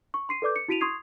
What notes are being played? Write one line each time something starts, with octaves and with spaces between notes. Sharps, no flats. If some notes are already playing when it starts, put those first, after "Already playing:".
C#6
C6 C7 D#7
A4 B4 D5 D6 G6
C#7
E4 F#4 B6 D7 D#7 F7
C6 C#6 D#6 G#6 C7 F7